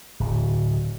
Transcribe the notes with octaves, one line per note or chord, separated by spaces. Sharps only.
D1